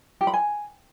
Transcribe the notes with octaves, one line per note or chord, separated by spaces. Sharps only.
G4
B5
G#5